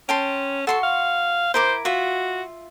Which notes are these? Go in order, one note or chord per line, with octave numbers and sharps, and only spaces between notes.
C#4 G5 A5 C6
F#4 A4 C6 C#6
F5
E4 A#4 C5 D6
F4 F#4 E5